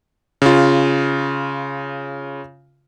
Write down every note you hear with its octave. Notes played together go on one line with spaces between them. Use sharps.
C#3 F4